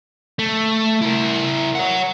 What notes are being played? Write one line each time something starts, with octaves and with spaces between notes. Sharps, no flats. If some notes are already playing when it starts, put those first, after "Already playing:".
A3
E4 A#4
C#5 F#5